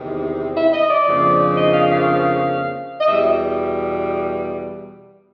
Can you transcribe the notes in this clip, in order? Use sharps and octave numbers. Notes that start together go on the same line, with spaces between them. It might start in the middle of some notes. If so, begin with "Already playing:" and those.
Already playing: E2 C3 D#3
E5
D#5
D5
F2 C#3 F3 A#3 D4
D#5
F5
F5
D#5
E2 B2 G3 E5